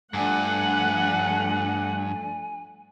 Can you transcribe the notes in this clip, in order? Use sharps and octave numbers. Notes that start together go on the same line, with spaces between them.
G2 F3 A3 D4 F#5 G#5